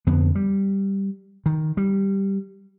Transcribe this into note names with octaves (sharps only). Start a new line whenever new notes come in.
F2 D3 B3
G3
D#3
G3